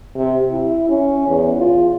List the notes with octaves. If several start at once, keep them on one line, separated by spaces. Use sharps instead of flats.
C3
E4
C#4
E2
F4